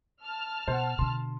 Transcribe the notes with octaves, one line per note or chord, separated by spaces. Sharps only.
A5 F6
B2 C5 F#5
B2 D3 C6